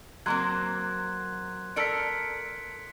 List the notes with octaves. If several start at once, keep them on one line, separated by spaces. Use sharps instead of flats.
F#3 A#3 C4 C6 F#6 G#6
A4 A#4 D5 B6 C#7 D7